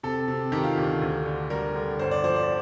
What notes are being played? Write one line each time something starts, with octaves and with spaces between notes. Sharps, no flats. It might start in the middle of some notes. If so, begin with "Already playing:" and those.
C3 A4
C3
D#3 G4
F4
D2 G4
D2
D3
G3 A#4
D3
G1 C5
D5
F3 C5
D5